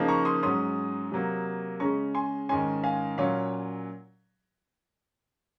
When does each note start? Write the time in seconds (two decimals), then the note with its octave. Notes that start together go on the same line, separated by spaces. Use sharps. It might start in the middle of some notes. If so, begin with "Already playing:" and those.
Already playing: C#3 F3 A#3 D#4
0.08 A#5 C#6
0.25 C6 D#6
0.43 G#2 F#3 C#4 C6 D#6
1.12 C3 F#3 A#3
1.80 C#3 G#3 C#4 A#5 C#6
2.15 G#5 C6
2.49 G#2 D#3 G#3 C#4 G#5 C6
2.84 F5 G#5
3.18 A#2 F#3 C#4 C#5 F5